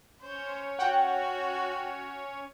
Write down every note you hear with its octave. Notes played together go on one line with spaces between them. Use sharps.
C#4 C5 C#5
F#4 F#5 G5